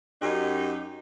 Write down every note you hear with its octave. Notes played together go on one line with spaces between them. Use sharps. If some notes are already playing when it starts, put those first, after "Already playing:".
F#2 D#4 G4